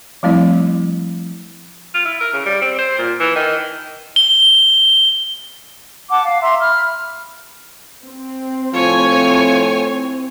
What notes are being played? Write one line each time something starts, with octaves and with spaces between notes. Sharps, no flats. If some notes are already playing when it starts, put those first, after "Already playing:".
F3 G3 A3 C4 E4 D#5
F4
E4
A#4
C#3
G3
C4
C5
A#2
E3
D#3
G7
F#5 A5 D6
F5
E5 A#5 C6
B5 F6
C4
A2 F3 C#5 G#5